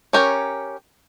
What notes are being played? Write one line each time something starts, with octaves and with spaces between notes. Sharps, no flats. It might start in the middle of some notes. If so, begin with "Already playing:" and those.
C#4 G4 A#4 C#5